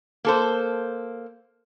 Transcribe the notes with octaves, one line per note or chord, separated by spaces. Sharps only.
A#3 A4 C5